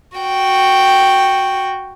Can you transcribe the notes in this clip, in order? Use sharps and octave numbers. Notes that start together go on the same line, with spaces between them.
F#4 G5